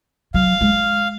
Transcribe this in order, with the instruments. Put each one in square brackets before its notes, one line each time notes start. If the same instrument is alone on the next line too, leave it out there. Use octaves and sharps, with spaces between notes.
[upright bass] F#3 [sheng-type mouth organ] F5
[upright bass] G#3